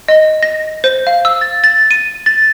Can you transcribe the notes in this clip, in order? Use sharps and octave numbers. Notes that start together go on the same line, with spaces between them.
D#5
A#6
C5
F5
E6
A6
A6
D#7
A6